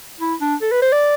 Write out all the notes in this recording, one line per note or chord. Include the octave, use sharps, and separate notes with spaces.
E4
D4
A4
B4
C5
D5